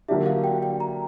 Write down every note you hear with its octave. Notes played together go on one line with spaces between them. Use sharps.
D3 F#3 A#3 D4 G4 E5
F5
G5
G5
A#5